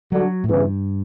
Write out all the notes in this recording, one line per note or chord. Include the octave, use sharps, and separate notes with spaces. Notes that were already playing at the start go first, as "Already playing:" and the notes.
D3 F#3 G3 D4 F#4
A2
E2 G2 C#3 E3